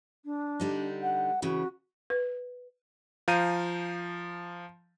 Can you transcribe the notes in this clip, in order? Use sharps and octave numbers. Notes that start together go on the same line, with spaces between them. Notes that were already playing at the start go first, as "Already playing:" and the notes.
D4
D3 G3 D#4
F#5
C#3 E3 F#4
B4
F3 F5 A#5 G6 D#7